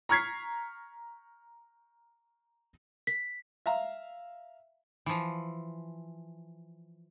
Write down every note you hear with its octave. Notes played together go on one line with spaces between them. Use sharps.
A#5 C#6 F6 G#6 B6 C7
B6
E5 F5 A#5
E3 F3